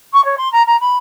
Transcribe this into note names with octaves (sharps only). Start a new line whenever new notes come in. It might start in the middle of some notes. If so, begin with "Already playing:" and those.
C#6
C#5
C6
A#5
A#5
B5